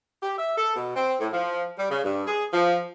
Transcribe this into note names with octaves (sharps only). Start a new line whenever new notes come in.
G4
E5
A4
B2
C4
A2
F3
G3
C#3
G2
G#4
F3